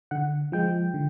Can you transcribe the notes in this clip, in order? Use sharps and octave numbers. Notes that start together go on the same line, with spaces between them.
D3 F#5
F3 G#3 G5
D3